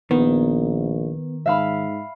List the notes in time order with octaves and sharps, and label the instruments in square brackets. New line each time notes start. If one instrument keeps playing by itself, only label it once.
[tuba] A#1 [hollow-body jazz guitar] D#3 [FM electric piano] B3
[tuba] G#2 [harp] E5 F5 B5